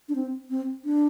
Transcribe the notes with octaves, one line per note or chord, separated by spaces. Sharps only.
D4
C4
C4
D4